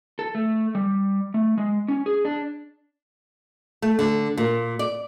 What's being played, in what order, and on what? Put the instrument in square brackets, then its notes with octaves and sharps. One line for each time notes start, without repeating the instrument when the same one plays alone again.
[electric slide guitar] A4
A3
G3
A3
G#3
C#4
G#4
D4
[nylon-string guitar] A3
D3
A#2
D5